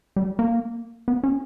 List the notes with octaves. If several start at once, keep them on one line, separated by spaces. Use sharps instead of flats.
G3
A#3
B3
C#4